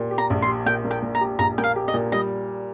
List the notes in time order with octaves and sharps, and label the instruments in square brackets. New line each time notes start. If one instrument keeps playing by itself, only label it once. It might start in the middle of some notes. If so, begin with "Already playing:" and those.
Already playing: [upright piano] A#2 G4
G4
[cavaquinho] A#5
[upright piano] A#1
[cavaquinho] C6
[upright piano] G4
[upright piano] A#2 [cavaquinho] G5
[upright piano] A#3
[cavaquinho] G5
[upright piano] A#2
[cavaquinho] A#5
[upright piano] G4
[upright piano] A#1 [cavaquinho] A#5
[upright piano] A#3 [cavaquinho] G5
[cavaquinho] F5
[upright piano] G4
[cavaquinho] D#5
[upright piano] A#2
[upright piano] G3 [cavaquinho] D#5